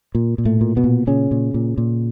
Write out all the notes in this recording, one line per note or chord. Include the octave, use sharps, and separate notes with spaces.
A#2
A#2
A2 A3
A#2
B2 B3
A#2
A#2 C#3 C#4
A#2
A#2
A#2